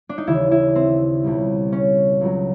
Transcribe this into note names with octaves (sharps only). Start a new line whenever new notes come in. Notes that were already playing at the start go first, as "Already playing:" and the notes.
D4
D#4
D#2 C#3 E3 E4
E4
C4
C#2 B2 G3
C#4
C#2 C#3 F#3